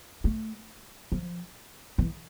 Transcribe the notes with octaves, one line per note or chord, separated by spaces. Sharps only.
A3
F3
E3